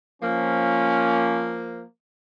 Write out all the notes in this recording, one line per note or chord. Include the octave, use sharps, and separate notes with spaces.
F3 A#3 C#4